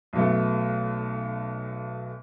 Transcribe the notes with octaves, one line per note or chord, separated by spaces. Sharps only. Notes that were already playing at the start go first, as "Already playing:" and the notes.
B1 B2 A3